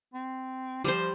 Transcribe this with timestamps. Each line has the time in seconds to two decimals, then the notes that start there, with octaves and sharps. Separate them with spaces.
0.14 C4
0.84 F3 G3 C5